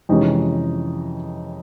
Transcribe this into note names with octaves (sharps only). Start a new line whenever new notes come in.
F2 C3 E3 G#3 C#4 D#4